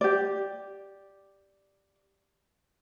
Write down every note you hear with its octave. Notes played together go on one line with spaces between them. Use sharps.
G4 D5